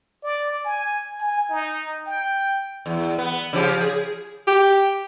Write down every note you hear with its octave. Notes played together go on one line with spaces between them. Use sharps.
D5
G#5
G#5
D#4
G5
E2
B3
C#3 F3 G4
G#4
G4